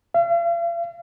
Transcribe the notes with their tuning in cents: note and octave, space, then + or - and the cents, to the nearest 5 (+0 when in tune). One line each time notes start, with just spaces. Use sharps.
F5 -45